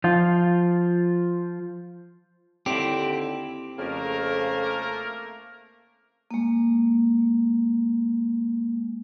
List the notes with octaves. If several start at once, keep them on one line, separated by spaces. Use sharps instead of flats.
F3 F4
D#2 D3 C4 E4 G4
F2 C#3 A3 A#3 A#4
G#3 A#3